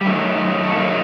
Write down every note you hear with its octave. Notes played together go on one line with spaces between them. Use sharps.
G3
F#2 D#3 F#3 A3
A3
F#2 D#3 F#3 A#3